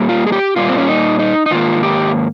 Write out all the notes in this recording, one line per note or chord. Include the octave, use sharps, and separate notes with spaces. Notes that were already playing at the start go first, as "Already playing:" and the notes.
Already playing: A#2 G3 A#3
F4
G#4
G4
A#2 G3 A#3 F4
C4
C#4
D#4
D#4
D#4
G#2 D#3 A#3 F4
G4